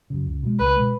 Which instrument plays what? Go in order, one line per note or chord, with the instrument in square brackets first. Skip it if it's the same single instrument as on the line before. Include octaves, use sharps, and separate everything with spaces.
[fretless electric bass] F#2 C#3
C#2
B2 G#3
[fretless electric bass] C#2 [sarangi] B4
[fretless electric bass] B2 G#3